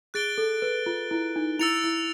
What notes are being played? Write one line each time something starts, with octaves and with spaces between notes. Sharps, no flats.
G#4 F#6 A6 D7 G7
A4
B4
F4
E4
D#4
E4 E6 A6 C#7 F7
E4